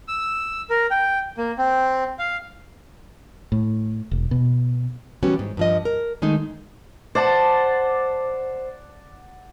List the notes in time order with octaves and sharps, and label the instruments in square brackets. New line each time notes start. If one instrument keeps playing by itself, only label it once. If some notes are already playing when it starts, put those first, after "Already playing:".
[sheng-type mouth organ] E6
A#4
G5
A#3
C4
F5
[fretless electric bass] A2
E1
B2
[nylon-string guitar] E3 G3 B3 C#4 F#4
G#2
G2 F3 D#5
A#4
D#3 G#3 A3 D#4
[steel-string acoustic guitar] C5 [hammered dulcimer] D5 F#5 A5